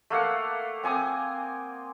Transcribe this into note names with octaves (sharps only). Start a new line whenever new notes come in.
A3 A#3 F5 F#5
C4 G#5 D6 D#6